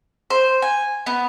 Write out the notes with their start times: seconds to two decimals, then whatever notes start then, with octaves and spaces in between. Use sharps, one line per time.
0.30 C5
0.62 G#5
1.06 B3